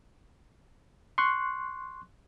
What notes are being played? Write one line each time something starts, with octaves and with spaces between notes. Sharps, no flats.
C6 C#6 F#6